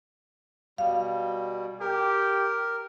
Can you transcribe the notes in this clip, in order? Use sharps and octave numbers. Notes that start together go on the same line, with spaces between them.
B2 G3 F5
G4 A#4